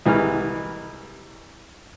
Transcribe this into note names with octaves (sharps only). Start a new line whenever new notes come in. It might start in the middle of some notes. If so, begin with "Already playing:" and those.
C2 E3 G3 G#3 F6